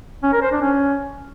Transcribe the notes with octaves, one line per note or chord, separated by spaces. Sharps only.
C#4
A#4
C5
D4
C#4